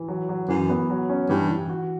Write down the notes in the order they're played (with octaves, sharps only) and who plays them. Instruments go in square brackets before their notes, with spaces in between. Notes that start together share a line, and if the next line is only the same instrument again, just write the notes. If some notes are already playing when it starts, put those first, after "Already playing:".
Already playing: [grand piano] E3
F#3
F#3
[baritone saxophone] F#2 [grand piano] E3
[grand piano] B3
F#3
C#4
[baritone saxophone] G2 [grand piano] E3
[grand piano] E3
F#4